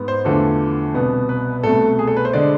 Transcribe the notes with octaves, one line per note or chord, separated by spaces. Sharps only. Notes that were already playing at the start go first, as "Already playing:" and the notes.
Already playing: G#2 B3
C5
E2 D3 F3 A3 A4
C2 B2 B3
B4
C2 B2 A3 A4
G#4
A4
B4
C5
D3 G#3 D5